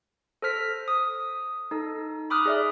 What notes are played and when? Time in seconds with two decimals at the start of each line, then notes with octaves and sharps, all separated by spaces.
0.42 A4 C5 F6 B6
0.88 D#6
1.71 D#4 A4
2.30 B5 D6 D#6 F6 F#6
2.46 G#4 D5 E5